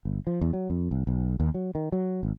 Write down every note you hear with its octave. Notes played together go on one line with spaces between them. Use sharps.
G1
F3
E2
F#3
F2
C2
B1
D#2
F#3
D#3
F#3
G#1